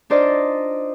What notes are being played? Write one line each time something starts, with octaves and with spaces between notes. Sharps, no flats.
D4 D#4 F4 C5 D5 D#5